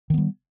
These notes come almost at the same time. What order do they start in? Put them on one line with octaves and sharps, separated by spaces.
D#3 B3 G3